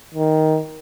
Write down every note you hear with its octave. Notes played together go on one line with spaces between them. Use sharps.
D#3